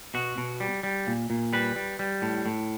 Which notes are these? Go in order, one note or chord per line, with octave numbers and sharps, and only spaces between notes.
B2 F#4
B2
G3
G3
A#2
A#2
G3 B4
G3
G3
A2
A2